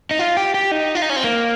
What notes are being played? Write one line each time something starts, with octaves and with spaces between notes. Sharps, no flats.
D#4
F4
G4
G4
D#4
F4
D#4
C#4
C4
A#3